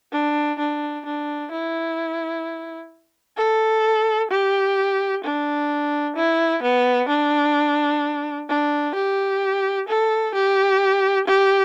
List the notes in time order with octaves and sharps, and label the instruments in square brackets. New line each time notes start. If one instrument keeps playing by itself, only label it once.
[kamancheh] D4
D4
D4
E4
A4
G4
D4
E4
B3
D4
D4
G4
A4
G4
G4